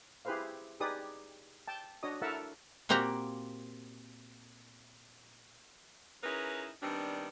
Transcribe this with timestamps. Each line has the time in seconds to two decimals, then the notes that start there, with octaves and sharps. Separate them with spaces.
0.25 E4 G4 G#4 B4 C5 F5
0.80 D#4 G4 G#4 B4 D5 D#6
1.67 G5 A5
2.03 D4 F#4 C#5 D#5 D#6
2.22 E4 A4 A#4 E5 F#5 A5
2.89 A#2 A#3 C4 F#4 G4 A#5
6.23 C#4 D#4 E4 G#4 A#4 B4
6.82 D#3 G3 B3 C4 D4